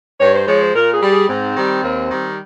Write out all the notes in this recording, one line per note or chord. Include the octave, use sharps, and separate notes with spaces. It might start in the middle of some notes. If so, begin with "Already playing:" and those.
G2 C#5
C5
F3 G#3 C#5
C5
A#2 A#4
G#4
G3
G#4
G#2 C4
D#3 G3
D#2
D#3 G3